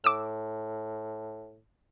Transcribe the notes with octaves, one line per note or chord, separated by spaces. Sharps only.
A2 D6 E6